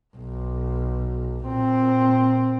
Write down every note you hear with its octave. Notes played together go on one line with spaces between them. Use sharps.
B1
A#2 C4